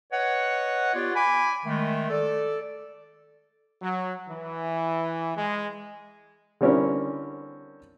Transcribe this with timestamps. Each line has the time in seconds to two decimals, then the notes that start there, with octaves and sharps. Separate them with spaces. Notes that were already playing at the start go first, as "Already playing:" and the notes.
0.11 B4 C#5 D#5 F#5
0.95 B3 F4 G4 C#5 D5
1.15 G#5 B5 D6
1.65 D#3 G#3 A3
2.10 A4 D5
3.81 F#3
4.28 E3
5.36 G#3
6.61 D3 G3 C4 C#4 E4 A#4